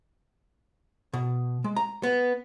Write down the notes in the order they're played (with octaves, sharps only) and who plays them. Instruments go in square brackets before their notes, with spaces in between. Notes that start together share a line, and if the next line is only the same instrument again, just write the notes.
[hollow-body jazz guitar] B2
G#3
A#5
B3